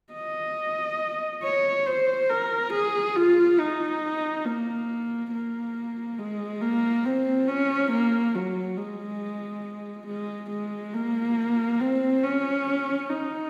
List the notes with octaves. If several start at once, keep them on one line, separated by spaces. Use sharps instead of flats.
D#5
C#5
C5
A#4
G#4
F4
D#4
A#3
A#3
G#3
A#3
C4
C#4
A#3
F#3
G#3
G#3
G#3
A#3
C4
C#4
D#4